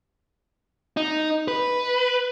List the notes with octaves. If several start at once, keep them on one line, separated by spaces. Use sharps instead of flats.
D#4
B4